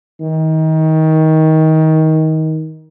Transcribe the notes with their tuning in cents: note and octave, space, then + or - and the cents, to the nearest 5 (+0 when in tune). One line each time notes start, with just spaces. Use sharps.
D#3 +25